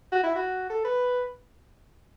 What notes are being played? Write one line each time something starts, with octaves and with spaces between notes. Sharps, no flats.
F#4
E4
F#4
A4
B4